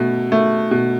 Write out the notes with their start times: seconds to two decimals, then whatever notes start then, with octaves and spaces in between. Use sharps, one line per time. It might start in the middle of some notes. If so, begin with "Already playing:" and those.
Already playing: B2 A3
0.32 A3
0.71 B2